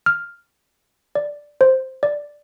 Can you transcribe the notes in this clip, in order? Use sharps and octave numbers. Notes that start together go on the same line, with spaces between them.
F6
D5
C5
D5